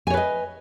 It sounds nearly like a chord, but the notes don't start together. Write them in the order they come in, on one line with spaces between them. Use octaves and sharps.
G#5 C#5 B4 D#5